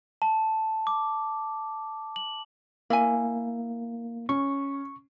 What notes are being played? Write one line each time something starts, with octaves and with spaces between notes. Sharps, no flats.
A5
D6
F#7
A#3 E4 G#5
C#4 C#6